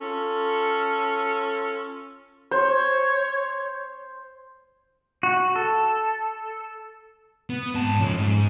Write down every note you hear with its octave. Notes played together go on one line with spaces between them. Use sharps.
C#4 F4 A4
C5 C#5
F#4
A4
B3
G#2 A5
F3 C#4
G#2